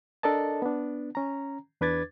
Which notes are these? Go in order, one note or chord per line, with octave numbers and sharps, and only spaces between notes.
D4 A4 A#4 D5 D#5 A5
B3 D4
C#4 A#5
E2 D4 B4 D6 G#6 A6